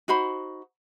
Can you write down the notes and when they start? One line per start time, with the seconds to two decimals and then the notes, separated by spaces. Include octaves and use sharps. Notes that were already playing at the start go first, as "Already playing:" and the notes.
0.08 D#4 F#4 C5 B5